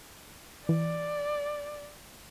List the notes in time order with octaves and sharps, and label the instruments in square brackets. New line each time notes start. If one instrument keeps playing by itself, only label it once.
[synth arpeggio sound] E3 [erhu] D5